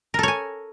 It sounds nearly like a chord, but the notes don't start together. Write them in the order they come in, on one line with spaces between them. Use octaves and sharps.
A#4 A4 C#5 G#5